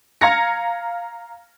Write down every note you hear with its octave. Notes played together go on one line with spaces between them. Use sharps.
F5 A#5 F6 G#6 A#6 C#7